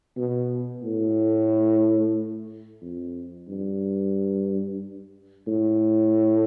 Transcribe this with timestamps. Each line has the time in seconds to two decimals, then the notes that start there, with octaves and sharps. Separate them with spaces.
0.17 B2
0.83 A2
2.82 F2
3.48 G2
5.47 A2